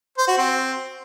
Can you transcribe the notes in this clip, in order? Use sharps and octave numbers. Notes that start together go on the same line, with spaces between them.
C5
F#4
C4